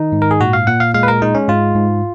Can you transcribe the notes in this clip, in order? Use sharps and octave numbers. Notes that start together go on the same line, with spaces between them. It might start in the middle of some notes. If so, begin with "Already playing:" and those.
Already playing: D#3 D#4
G#2
A#4
G#4
A#2 F#4
F5
A#2 F#5
F5
G#3 F5
B4
A#4
G#3 D#4
C#4
G#2 F4
G#2